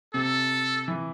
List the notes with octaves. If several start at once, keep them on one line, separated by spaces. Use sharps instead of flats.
C3 A4
E3